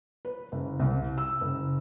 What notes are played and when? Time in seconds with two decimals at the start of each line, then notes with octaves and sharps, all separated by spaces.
0.25 B4
0.52 F#1
0.80 C2
1.18 E6
1.41 F#1